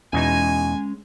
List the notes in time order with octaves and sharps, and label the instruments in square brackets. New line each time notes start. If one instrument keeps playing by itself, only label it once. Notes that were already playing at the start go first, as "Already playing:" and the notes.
[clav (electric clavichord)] E2 B2 D#4 [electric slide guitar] G#3 C#4 [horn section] G#5